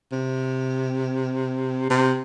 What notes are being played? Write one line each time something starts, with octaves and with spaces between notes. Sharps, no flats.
C3
C3